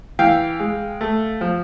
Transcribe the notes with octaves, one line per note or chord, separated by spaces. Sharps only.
E3 F5 G5
G#3
A3
F3